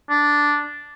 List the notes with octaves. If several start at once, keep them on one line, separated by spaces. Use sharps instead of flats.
D4